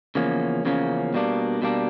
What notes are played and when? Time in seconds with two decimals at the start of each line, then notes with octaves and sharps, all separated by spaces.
0.15 E2 C#3 F3 A#3 C#4
0.65 E2 C#3 F3 A#3 C#4
1.14 B2 G3 A#3 D4
1.62 B2 G3 A#3 D4